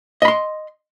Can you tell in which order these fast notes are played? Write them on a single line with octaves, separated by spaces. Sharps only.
D#5 B5 C6